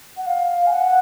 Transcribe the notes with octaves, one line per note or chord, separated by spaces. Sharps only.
F#5
F5
G#5
F#5